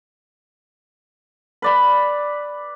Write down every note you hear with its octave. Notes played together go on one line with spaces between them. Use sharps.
B4 D5 B5